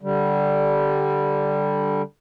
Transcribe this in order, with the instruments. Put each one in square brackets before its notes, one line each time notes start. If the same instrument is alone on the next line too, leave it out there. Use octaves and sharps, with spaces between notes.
[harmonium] D3 G3